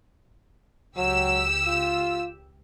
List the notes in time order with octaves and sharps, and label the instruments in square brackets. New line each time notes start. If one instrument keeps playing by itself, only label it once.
[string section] C#2 G4 E6 [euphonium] F#3
[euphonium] F4